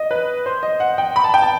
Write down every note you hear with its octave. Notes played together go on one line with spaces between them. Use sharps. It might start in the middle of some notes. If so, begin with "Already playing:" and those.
Already playing: D#5
B4
C5
D#5
F#5
G5
B5
A5
G5
A5